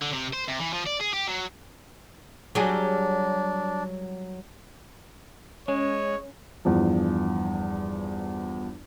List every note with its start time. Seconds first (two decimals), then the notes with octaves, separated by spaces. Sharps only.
0.01 D3
0.13 C3
0.33 C5
0.48 C3
0.59 E3
0.73 F3
0.86 D5
1.00 G#4
1.13 G4
1.27 F#3
2.55 F#3 G3 D4 G#4
5.68 G#3 C#4 C#5
6.65 E2 G2 F3